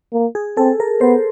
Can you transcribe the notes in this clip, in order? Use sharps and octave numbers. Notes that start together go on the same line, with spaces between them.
A#3
G#4
C4 A4
A#4
B3 C5